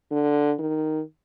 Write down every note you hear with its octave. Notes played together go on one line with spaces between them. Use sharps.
D3
D#3